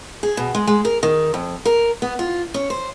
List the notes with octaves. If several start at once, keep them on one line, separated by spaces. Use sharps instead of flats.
G#4
B2
G#3
G#3
A#4
D#3
F2
A#4
B3
F4
C#4
C5